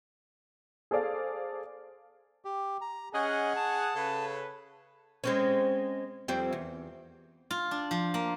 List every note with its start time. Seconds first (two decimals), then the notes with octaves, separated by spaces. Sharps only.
0.91 G#4 A4 C5 D5 F5
2.45 G4
2.81 A#5
3.14 C#4 G#4 D#5 F#5
3.56 A5
3.95 C#3 A4 B4
5.24 G#3 C4 C#4
6.28 F2 G3 C4
6.53 E2
7.51 F4
7.71 D4
7.91 F3
8.14 A#3